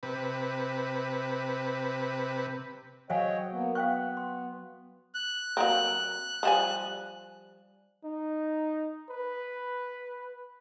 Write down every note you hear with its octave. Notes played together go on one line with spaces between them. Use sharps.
C3 B4
F#3 C5 C#5 D#5 F5 G5 G#5
A#3 B3
B3 F5 G5 C#6 F#6
C6
F#6
F#3 A#3 C4
F3 G3 G#5
D#4
B4